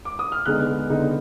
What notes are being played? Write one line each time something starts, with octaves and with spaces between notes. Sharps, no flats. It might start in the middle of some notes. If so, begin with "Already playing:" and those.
D6
D#6
F6
D3 G#3 B3 D#4 F#6
D3 G#3 B3 D#4